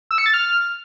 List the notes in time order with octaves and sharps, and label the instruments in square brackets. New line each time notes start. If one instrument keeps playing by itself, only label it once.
[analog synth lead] E6
C#7
A6
F6